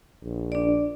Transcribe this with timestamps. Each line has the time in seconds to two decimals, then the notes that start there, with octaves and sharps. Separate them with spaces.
0.22 A#1
0.52 D4 D5